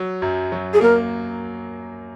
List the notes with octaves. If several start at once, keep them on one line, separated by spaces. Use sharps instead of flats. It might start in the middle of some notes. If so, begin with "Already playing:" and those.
Already playing: F#3
F#2
F#3
G#4
A#3 A#4